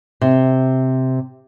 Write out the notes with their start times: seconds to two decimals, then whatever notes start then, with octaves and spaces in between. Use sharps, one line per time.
0.21 C3